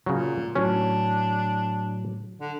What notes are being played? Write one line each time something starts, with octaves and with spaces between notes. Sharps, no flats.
A#2 C#3 F#3
A2 F#3 C#4 D4
D3